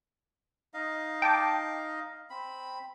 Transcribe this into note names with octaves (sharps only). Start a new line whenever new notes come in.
D#4 D#5 F5
G5 A5 D6
C4 B5